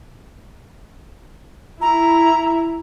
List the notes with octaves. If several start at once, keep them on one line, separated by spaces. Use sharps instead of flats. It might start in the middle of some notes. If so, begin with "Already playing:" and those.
E4 A#5